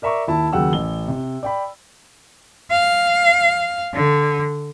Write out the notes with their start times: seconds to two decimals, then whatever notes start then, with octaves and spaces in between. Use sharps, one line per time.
0.02 A#4 D5 E5 A#5 C#6 D6
0.28 D#2 E4 A5
0.53 D#2 C#3 F#3 F#5 G5 E6
0.73 A1 G7
1.08 C3
1.43 D5 G5 B5
2.71 F5
3.94 D3